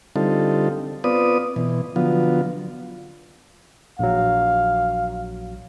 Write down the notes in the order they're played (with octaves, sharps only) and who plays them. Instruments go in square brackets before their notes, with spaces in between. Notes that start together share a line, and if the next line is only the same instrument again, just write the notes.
[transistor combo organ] D3 G3 C4 D#4 F4 A4
B3 C4 F4 B4 D5 D#6
B2 E3
D3 F3 F#3 B3 F4
[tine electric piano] A#1 F#3 [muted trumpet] F5